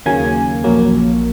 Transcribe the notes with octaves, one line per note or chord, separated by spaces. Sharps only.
D#2 C#3 F#3 A#3 G#5
A#1 A#2 F#3 A#3